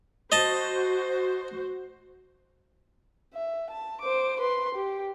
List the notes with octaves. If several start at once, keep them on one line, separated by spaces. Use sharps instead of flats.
F#4 C5 D#5 A5
E5
A5
C5 D6
B4 C6
G4